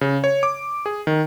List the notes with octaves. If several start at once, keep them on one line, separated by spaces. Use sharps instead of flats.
C#3
C#5
D6
G#4
D#3